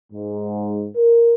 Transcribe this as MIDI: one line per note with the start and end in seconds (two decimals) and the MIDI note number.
0.13 0.88 44
0.96 1.35 70